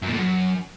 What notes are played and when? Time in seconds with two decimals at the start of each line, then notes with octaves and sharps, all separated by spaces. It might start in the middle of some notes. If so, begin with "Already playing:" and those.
0.02 F#2
0.08 A#2
0.13 A2
0.18 F#2